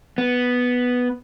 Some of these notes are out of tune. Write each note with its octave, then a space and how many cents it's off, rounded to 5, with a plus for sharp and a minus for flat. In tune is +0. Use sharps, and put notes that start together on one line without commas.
B3 +0